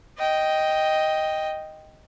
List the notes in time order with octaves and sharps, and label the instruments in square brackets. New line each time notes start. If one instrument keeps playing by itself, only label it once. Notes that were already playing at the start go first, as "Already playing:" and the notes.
[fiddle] D#5 G5